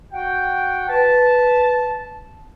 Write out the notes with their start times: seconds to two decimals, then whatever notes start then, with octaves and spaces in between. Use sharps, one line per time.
0.12 F#4 F#5 G5
0.89 B4 A5